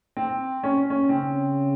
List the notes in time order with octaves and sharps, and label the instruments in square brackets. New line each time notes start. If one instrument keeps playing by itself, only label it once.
[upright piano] C4
C#4
C#4
[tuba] C#3 [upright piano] C4